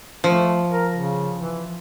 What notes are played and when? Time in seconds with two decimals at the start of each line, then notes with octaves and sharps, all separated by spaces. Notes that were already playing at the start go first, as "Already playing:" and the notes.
0.24 F3 A3
0.71 A#4
0.93 C#3
1.37 E3